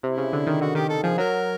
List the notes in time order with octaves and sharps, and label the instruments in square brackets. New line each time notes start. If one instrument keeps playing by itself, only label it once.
[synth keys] C3 [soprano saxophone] E4
[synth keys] C#3
D3
D#3
[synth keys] D3 [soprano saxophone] F#4
[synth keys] D#3 [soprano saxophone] G4
[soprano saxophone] A4
[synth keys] F3 [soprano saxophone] G#4
[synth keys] F#3 [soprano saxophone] A#4